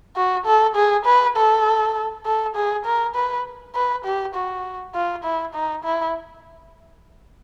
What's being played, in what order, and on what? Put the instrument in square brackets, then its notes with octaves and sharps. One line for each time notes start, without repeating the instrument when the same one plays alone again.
[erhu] F#4
A4
G#4
B4
A4
A4
G#4
A#4
B4
B4
G4
F#4
F4
E4
D#4
E4